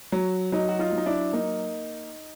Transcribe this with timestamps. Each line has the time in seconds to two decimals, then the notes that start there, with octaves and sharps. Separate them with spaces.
0.12 F#3
0.52 F#3 D#4
0.68 F#4
0.79 D#4 F4
0.92 F#3
0.98 D#4
1.06 D4 E4
1.33 A#3 D#4